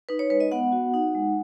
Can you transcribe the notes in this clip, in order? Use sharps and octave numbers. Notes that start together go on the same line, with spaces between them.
D#4 B4
C#5
G#3 B4
D#5
B3 F#5
F#4
D#4
G#3